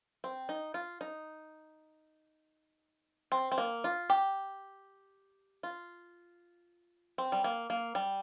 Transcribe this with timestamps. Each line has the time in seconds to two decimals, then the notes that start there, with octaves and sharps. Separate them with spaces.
0.24 C4
0.49 D#4
0.74 F4
1.01 D#4
3.32 C4
3.52 C4
3.58 A#3
3.84 F4
4.10 G4
5.63 F4
7.18 C4
7.32 G3
7.44 A#3
7.70 A#3
7.95 G3